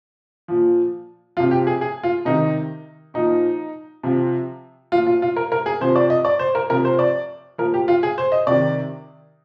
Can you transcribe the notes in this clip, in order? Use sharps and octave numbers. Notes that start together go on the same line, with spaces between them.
A#2 F3
C3 F3 F4
G4
G#4
G#4
F4
C3 D#3 D#4
A#2 F3 D#4
C3 F3
A#2 F3 F4
F4
F4
A#4
A#4
G#4
C3 F3 C5
D5
D#5
D5
C5
A#4
C3 F3 A#4
C5
D5
A#2 F3 A#4
G4
F4
G#4
C5
D#5
C3 D#3 D5